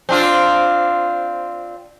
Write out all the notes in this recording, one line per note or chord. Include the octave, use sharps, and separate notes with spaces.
C4 D4 F4